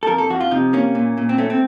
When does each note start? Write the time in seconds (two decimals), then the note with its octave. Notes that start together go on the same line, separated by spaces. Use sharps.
0.03 A4
0.07 F2 A#4
0.18 A4
0.30 F3 F#4
0.40 F4
0.51 C3 D#4
0.73 A#3 C#4
0.95 A#2
1.18 A#2
1.29 C4
1.38 A3 C#4
1.50 C4